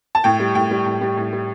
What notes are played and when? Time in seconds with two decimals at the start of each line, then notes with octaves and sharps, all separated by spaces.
0.15 A5
0.24 A2 G5
0.40 G3
0.55 A2 G5
0.71 G3
0.86 A2
1.01 G3
1.17 A2
1.33 G3